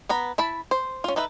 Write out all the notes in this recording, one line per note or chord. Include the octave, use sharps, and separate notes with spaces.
B3 A#5 B5
E4 A5 B5
C5
C#4 F4
D#4 A4 B4 E5